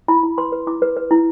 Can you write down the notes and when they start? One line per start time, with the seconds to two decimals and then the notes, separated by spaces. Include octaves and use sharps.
0.08 E4 B5
0.23 E4
0.38 B4 C6
0.52 B4
0.67 E4 D6
0.82 B4
0.97 B4
1.11 E4